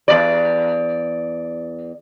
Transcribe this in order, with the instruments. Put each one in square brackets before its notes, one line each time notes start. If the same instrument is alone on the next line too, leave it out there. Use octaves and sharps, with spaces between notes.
[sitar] E2 D5